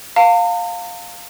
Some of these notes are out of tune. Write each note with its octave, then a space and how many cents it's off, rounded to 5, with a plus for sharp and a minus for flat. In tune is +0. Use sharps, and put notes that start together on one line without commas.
F5 +10 A#5 -45